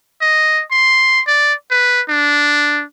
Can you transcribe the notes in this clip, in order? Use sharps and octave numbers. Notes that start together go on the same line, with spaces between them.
D#5
C6
D5
B4
D4